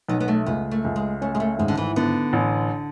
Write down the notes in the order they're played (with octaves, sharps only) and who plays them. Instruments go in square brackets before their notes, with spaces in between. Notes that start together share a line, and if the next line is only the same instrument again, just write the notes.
[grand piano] B1 [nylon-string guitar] B3
[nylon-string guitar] B3
A3
[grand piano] C#2 [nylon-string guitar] B3
[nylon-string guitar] A3
[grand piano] C#2
[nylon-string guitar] G#3
[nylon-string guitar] A3 [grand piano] C#4
[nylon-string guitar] G#3
A3
[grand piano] G#1 [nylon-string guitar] G#3
[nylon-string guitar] D3
E3
[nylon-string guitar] D3 [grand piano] B3
[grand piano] A1